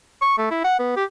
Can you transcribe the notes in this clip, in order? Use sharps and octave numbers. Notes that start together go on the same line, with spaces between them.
C#6
A3
E4
F#5
B3
G4